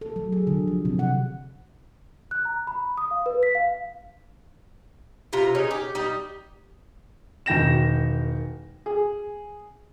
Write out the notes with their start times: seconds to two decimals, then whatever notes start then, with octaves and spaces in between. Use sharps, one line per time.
0.01 A4
0.16 F#3
0.32 G#4
0.47 D3
0.68 F3
0.85 C3
0.99 F#5
2.31 F#6
2.45 A#5
2.67 B5
2.97 D#6
3.11 F5
3.26 B4
3.43 B6
3.55 F5
5.33 C3 F4 A#5
5.55 C#3 C#4 D#4
5.71 G4
5.95 G3 D#4
7.46 E1 D#3 G5 A#6 E7
8.86 G#4